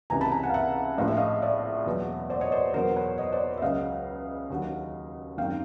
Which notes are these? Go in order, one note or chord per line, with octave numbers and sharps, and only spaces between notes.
C#2 C3 E3 G#5 A#5
A5 B5
G#5 A#5
F#5 G#5
F5
E5 F#5
A#1 A2 F3 F5
E5
D#5 F5
D5 E5
E2 B2 F#3
C5 D5
C#5 D#5
C5 D5
E2 B2 F#3 A#4 C5
B4 C#5
C#5 D#5
C5 D5
E5
C#2 C#3 F#3 D#5 F5
D#2 D3 F#3
G#1 F#2 D#3 F5 G5